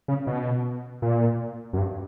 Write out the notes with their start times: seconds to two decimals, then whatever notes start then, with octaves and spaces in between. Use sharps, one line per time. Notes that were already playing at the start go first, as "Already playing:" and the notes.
0.08 C#3
0.27 B2
1.02 A#2
1.73 F#2
1.78 G2